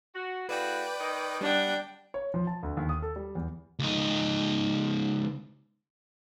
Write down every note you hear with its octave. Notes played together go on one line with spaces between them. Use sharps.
F#4
A2 C#3 F#4 B4 D5 G5
D#3 D#5
G3 D4 F#5 G5
C#5
F3
A5
D2
D#2
D#6
A4
G3
E2
C#2 D#4